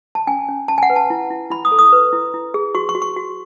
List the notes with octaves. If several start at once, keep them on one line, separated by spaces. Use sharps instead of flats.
A5
C#4 G#5
C#4
C#4 A5
G#5
F#5
B4
A5
E4
E4
E4 B5
D#6
A4
D#6
B4
E4
E4
G#4
F#4 C#6
C#6
F#4
C#6
F#4